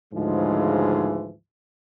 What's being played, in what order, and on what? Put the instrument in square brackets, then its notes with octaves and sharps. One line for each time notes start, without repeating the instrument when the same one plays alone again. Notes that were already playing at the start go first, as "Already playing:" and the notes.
[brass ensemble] D2 G#2 C#3 E3 F3 G#3